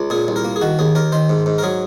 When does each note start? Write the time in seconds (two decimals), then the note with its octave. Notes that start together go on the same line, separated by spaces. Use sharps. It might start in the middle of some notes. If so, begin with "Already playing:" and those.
Already playing: C#2
0.10 A#2 G#4
0.28 C2
0.36 A#4
0.45 A#3
0.56 G#4
0.61 D#3 F#4
0.79 D#2 G#4
0.95 D#2 A#4
1.12 D#3 C5
1.29 G#2
1.46 G#2
1.58 A#4
1.63 F#3 G#4